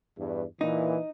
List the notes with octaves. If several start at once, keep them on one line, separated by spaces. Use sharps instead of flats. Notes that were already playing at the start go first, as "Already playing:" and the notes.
E2 G2
A#2 E3 D#4